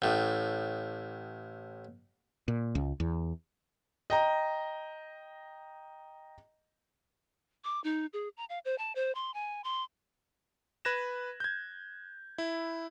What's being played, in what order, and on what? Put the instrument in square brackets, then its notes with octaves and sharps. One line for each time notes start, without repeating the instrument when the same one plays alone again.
[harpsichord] A1 A2
[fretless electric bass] A#2
C#2
E2
[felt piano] D#5 G5 A#5
[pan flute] D6
D#4
G#4
A#5
F5
C5
A5
C5
C6
G#5
C6
[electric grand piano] B4 F#6 G#6 A#6 E7
G6 G#6
E4